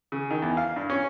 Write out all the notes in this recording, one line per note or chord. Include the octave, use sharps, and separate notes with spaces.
C#3
D#3
E2
F5
G2
C#4